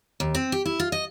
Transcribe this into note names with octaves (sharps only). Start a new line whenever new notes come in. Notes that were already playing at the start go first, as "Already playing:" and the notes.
D#2
C4
G4
E4
F4
D#5